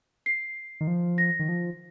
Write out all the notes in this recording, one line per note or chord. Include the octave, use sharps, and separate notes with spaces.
C7
D#3
F3
A#6
D#3
F3